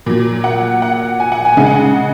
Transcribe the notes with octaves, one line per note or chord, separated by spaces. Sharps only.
A#2 F#3
F#5
F#5
G#5
F#5
G#5
C#3 G#3 G#5
F#5